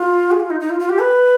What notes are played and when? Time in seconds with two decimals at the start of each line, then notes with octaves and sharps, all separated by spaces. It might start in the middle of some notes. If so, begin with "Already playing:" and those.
Already playing: F4
0.31 G#4
0.40 F4
0.50 D#4
0.60 D#4
0.70 F4
0.80 F4
0.89 G4
0.99 B4